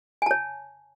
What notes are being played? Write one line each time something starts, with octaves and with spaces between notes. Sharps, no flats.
C#5 G#5 A5